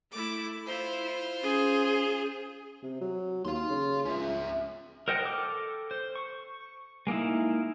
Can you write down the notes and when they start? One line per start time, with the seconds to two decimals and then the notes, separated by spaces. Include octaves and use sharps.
0.12 A3 E4 D6
0.66 E4 F4 C5
1.43 C#4 G#4
2.83 C3
3.01 F#3
3.45 D#2 F5 C6
3.70 C#3
4.06 C#2 C#4 E5
5.08 A#4 C5 D#5 F#5 G5
5.25 A4 D6 F6
5.91 C5
6.16 C#6
7.07 G#3 A#3 D#4 E4